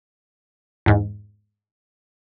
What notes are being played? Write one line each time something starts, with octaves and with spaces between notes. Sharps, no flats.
E2 G#2